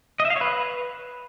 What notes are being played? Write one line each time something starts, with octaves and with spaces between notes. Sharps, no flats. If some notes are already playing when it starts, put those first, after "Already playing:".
D#5
E5
F5
C#5
B4